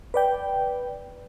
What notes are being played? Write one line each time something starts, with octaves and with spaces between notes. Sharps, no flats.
B4 D5 G5